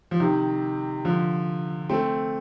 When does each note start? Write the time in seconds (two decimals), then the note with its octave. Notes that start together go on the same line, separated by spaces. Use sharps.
0.11 F3
0.20 C3 D#3
1.05 D3 F3
1.89 A3 C4